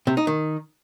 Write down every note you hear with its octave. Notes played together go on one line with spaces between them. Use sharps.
C3
D#4
D#3